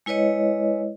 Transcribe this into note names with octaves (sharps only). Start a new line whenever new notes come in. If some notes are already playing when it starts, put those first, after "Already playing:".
G#3 E4 B4 C#5 D#5